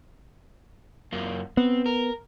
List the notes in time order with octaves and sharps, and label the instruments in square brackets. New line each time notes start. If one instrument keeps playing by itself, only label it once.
[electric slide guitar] F#2 A#3 F4
[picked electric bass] B3 [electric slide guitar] C4
[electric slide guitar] A#4